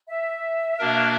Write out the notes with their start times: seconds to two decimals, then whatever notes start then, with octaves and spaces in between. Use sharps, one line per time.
0.09 E5
0.79 B2 A#3 D4 A#4